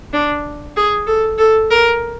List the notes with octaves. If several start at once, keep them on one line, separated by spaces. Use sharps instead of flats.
D4
G#4
A4
A4
A#4